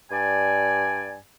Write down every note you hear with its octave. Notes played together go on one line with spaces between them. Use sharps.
G2 D5 G#5